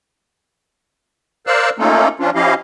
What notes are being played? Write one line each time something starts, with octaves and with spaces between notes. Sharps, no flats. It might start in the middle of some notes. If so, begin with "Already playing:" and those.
A#4 C5 D5 F5 E6 F#6
A3 A#3 C#4 D#4 F4 A4
F3 C#4 D4 F4
F3 C#4 E4 G4 D#5 F5